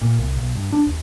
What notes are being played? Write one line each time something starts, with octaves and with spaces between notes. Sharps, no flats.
A#2
C2
B1
G2
D4
D#2